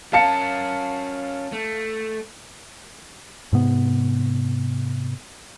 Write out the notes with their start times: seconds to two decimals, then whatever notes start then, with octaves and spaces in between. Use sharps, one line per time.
0.13 C#4 A#4 F5 A5 C#7
1.52 A3
3.53 G#2 C3 B3